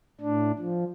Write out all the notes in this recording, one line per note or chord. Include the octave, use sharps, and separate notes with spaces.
A2 D4
F3